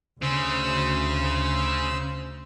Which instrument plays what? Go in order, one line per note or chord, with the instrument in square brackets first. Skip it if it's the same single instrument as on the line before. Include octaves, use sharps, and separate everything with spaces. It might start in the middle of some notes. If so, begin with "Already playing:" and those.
[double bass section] D2 [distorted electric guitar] C#3 [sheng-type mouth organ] C5 E6